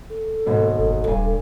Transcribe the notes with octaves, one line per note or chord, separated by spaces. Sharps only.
A4
D#2 G#2 B2
F#1
D#1 G2 G#5